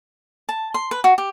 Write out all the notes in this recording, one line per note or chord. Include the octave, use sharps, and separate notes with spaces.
A5
C6
B4
F#4
G4